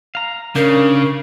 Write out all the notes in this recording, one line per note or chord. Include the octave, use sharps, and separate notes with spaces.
F5 A#5
C#3 D4 A#4 F5 G6